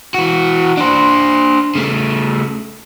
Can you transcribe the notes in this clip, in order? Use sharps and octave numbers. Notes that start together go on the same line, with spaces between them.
E3 F#4
D4 C5
C#3 A3